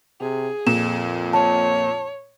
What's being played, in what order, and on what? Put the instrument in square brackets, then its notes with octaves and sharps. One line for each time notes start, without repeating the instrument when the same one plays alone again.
[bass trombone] C3 [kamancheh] G#4
[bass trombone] F2 [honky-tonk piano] A#2 [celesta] E7
[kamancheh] C#5 [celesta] A5